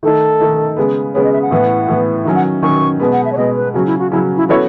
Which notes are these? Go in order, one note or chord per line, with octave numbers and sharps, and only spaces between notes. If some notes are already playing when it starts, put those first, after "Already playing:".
D#3 A3 D#4 A4
D#3 A3 D#4
C#3 G#3 B3
C#3 G#3 B3 C#5
D#5
E5
F#5
A2 E3 B3
A2 E3 B3
D#3 F#3 C#4
F#5
D#3 F#3 C#4 C#6
B2 G#3 B3
F#5
E5
C#5
B2 G#3 B3 D#5
B4
C#3 F#3 C#4 F#4
E4
F#4
C#3 F#3 C#4 E4
E4
E3 B3 E4 F#4 A4 C#5